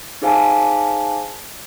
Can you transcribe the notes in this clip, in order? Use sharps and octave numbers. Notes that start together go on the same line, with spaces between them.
D#4 G#4 C5 F5 G#5 A5